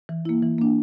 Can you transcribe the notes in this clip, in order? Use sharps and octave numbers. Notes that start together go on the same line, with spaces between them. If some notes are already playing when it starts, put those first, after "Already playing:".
E3
A#3 E4
E3
A#3 D4